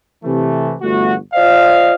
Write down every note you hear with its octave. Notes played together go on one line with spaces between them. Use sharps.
C3 E3 A3
G1 E2 A3 F#4
F4 C5 D5 D#5 F5